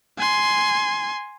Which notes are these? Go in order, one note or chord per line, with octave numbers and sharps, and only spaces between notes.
G#5 C6